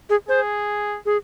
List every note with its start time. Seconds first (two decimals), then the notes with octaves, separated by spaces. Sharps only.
0.10 G#4
0.29 G#4 C5
1.06 G#4